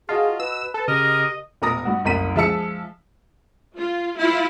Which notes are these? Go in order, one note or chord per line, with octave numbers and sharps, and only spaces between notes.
F4 F#4 G#4 D#5 A5
B4 E6
A4
C#3 G4 A#4 D#5
E1 A#2 A#4 D#6 A#6
G2 F#4
F#1 C2 A#4 B6 D#7
F3 G#3 E5 A5 E6 C#7
F4
E4 F4